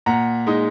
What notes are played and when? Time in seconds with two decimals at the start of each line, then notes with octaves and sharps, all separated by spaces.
0.06 A#2 F#5 A#5
0.47 G#3 D#4